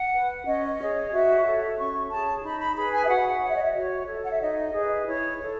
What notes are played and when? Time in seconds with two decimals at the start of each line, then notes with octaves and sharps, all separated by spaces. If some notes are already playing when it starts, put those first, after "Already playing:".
Already playing: F#5
0.14 B4
0.46 C#4 D#5
0.79 G#4 C#5
1.12 F#4 E5
1.45 A4 C#5
1.78 C#4 C#6
2.11 G#4 C#5 A5
2.43 D#4 B5
2.59 B5
2.76 G#4 B4 B5
2.93 G#5
3.04 E5
3.09 F#4 F#5
3.42 C#5 F#5
3.49 E5
3.56 D#5
3.63 E5
3.74 F#4 C#5
4.07 A4 C#5
4.23 F#5
4.31 E5
4.41 D#4 D#5
4.72 G#4 B4
5.06 E4 C#5
5.39 A4 C#5